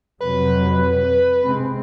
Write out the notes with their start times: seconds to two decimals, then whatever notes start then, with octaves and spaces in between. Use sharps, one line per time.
0.20 F2 C3 F#3 B4
1.42 C3 G#3 C4